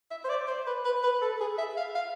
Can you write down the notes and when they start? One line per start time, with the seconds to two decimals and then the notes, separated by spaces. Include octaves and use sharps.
0.11 E5
0.24 C5
0.29 D5
0.48 C5
0.67 B4
0.85 B4
1.03 B4
1.22 A4
1.40 G#4
1.58 E5
1.77 F5
1.95 F5